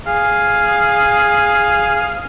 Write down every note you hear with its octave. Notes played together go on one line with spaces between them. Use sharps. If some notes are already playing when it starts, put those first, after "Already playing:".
G#4 F5